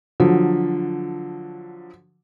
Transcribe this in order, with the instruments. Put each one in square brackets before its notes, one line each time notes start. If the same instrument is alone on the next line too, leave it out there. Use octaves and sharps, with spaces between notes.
[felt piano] D3 F3 F#3